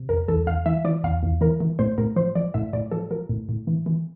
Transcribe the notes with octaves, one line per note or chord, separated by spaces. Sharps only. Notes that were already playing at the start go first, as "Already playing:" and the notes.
Already playing: C3
F2 A#4
E2 A4
E2 F5
E3 E5
E3 D5
E2 F5
E2
E3 A#4
E3
A2 C5
A2 A#4
F3 C5
F3 D5
A2 E5
A2 D5
F3 A4
F3 A#4
A2
A2
E3
E3